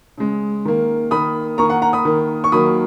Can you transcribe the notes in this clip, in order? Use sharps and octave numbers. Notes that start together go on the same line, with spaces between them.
C#3 G#3
D#3 A#3
D#3 A#3 B5 D#6
D#3 A#3 A#5 C#6
F#5 A#5
F#5 A#5
B5 D#6
D#3 A#3
C#6
D#3 F#3 A#3 B5 D#6